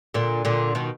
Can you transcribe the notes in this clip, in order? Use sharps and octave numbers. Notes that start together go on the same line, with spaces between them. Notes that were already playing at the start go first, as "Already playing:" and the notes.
A#2 D3
A#2 D3
B2 D#3